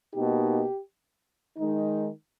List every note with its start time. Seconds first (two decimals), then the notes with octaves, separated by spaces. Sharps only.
0.14 B2 A#3 D#4 G4
1.58 D#3 G#3 D#4